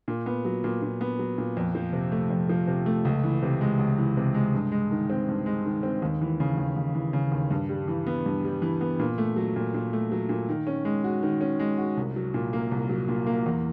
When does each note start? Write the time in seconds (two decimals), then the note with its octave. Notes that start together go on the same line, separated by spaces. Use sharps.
0.08 A#2
0.26 B3
0.45 F#3
0.64 A#2
0.82 A#2
1.01 B3
1.19 F#3
1.38 A#2
1.57 F2
1.75 F3
1.93 C3
2.12 A3
2.30 F2
2.49 F3
2.68 C3
2.86 A3
3.05 C#2
3.24 E3
3.42 C3
3.61 G#3
3.79 C#2
3.98 E3
4.17 C3
4.34 G#3
4.54 G2
4.72 G#3
4.91 D#3
5.10 C4
5.28 G2
5.46 G#3
5.66 D#3
5.83 C4
6.02 D#2
6.21 E3
6.40 C#3
6.58 D#2
6.76 D#2
6.95 E3
7.13 C#3
7.32 D#2
7.51 G2
7.69 G3
7.88 E3
8.07 B3
8.26 G2
8.44 G3
8.62 E3
8.81 B3
8.99 A#2
9.18 A3
9.36 F#3
9.56 A#2
9.74 A#2
9.93 A3
10.12 F#3
10.29 A#2
10.49 D#3
10.67 C#4
10.85 G#3
11.04 F#4
11.23 D#3
11.41 C#4
11.59 G#3
11.78 F#4
11.97 C2
12.16 F#3
12.34 A#2
12.53 A#3
12.71 C2
12.89 F#3
13.08 A#2
13.26 A#3
13.46 E2